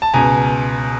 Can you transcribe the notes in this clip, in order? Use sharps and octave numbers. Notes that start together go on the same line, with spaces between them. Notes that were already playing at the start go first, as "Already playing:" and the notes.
A5
C#2 B2 G#5 A#5